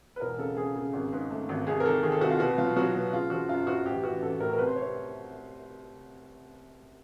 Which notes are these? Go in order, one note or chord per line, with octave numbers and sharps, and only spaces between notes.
B4
E1 A#4
C#3 A4
C#3 G#4
C#3
G#1
G#2
A3
G#1
C2 G#4
A#4
D#3 A4
D#3 G#4
A4
C2 F#4
F4
B2 F#4
F#3 F4
F#3 F#4
B2
C#3 F4
F3 F#4
F#2 F4
F#2 F#4
A1 G4
E3 F#4
A1 A4
A2 A#4
A#4
C2 B4
C5
C3 C#5